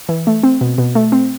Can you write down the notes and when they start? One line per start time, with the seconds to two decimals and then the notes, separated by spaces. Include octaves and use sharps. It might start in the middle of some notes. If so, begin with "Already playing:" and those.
0.09 E3
0.27 A3
0.43 C4
0.61 B2
0.78 B2
0.95 A3
1.12 C4